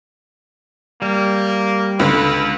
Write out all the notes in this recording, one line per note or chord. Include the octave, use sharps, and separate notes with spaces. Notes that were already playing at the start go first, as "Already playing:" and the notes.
G3 A#3
C#2 D3 B4